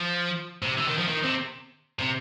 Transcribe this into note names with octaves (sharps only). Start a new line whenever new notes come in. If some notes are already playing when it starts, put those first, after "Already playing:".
Already playing: F3
C3
D3
D#3
F3
D#3
C3
C3